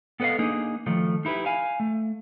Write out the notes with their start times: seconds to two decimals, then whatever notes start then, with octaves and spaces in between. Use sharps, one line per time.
0.20 B3 A4 B4 D5 D#5 F5
0.39 A#3 D4 D#4 G#4
0.86 D#3 F3 A3
1.25 D#4 E4 G4 B4
1.46 F5 G#5
1.80 A3